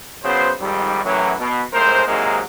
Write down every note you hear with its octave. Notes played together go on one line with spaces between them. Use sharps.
C#3 F#3 B3 C5
F2 G#2 D#3 G3
F#2 A2 E3 F#3
B2
F2 A2 G#3 A#4 C5
G#2 C3 F#3 G#3 A#3 D#4